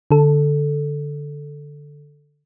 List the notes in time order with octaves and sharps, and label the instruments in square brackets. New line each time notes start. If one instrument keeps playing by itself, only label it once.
[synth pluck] D3 A4